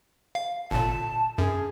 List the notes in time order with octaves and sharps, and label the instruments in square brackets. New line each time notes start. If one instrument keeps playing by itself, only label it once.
[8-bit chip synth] F5
[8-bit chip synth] G1 A#2 [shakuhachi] A5
[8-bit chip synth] F#2 [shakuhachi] G#4